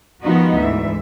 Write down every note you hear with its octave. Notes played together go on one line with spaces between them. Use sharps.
D#3 F3 G#3 B3 D#4 F#4
D2 G#2 E3 E5